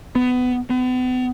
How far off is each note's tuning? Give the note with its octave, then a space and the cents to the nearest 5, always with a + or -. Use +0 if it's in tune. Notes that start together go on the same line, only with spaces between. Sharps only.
B3 +20
B3 +40